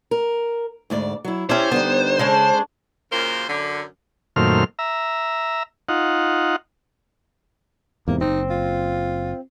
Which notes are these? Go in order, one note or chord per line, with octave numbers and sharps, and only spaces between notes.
A#4
D2 G#2 D5
F#3 E4
C#4 E4 G4 C5 D5 E5
D3 G3 B3 D#4
C#3 G#3 C#4 D4
F#2 A#2 C#3 A#3 C5
F#2 D3
F#2 A#2 D#3 A3 C5 F6
E5 A#5
D#4 F4 F#5
E2 G#2 C3 A#3
F#1 C4 D#4
F4